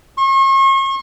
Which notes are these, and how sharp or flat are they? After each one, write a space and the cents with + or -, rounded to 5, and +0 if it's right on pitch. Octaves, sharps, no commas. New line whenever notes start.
C#6 -40